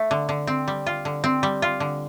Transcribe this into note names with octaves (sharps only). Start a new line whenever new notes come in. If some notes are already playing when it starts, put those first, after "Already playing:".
Already playing: A3
D3
D3
C4
G3
F4
D3
C4
G3
F4
D3